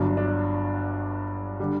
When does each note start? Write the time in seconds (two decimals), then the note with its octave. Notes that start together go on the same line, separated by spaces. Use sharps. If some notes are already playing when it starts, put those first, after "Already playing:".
Already playing: G1 G2 F#3 D4
0.17 D4
1.60 D3 G3